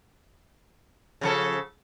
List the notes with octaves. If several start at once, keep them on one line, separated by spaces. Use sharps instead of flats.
C#3 F3 A4